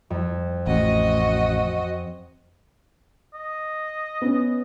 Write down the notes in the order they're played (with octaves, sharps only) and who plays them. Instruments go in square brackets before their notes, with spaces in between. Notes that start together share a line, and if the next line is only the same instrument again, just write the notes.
[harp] F2
[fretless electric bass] A1 [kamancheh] F#4 D#5
[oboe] D#5
[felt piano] B3 C#4